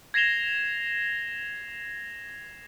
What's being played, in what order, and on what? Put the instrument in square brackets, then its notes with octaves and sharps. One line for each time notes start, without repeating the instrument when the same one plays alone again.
[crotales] G#6 A#6 C7 E7 F7 G7